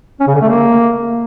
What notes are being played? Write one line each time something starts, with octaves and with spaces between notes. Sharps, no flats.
C#4
C#3
D3
A3
A#3